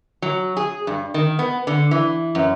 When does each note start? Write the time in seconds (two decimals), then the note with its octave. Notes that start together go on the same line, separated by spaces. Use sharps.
0.22 F#3
0.57 G#4
0.87 G2
1.14 D#3
1.39 B3
1.67 D3
1.91 E3
2.35 F#2